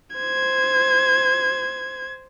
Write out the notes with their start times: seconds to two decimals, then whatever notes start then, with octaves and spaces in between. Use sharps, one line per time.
0.15 C5 G#6